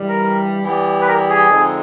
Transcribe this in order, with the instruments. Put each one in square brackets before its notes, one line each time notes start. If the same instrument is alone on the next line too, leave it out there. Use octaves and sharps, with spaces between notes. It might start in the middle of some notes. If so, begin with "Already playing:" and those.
Already playing: [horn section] G2 E3 G3
[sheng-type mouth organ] A#4
[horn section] E3 G3 B3 D4 G4
[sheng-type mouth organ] B4
A#4
G#4
[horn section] D3 F3 G#3 C4 D#4